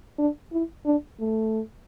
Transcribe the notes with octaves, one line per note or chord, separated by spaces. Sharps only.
D4
E4
D4
A3